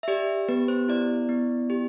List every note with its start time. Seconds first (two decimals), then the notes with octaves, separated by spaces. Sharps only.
0.03 E5
0.08 G4 D5
0.48 B3 B4
0.68 C5
0.88 E4 D5
1.29 B3
1.70 G4